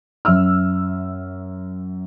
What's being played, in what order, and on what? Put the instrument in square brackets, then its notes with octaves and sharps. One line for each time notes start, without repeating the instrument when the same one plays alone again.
[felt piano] F#2 E5 E6 F6